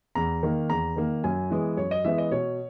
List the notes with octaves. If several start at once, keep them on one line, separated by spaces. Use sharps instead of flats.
E2 A#5
D#3 A#3
E2 A#5
D#3 A#3
F#2 G#5
E3 G#3 B3
F#2 C#5
D#5
E3 G#3 B3 E5
D#5
B2 C#5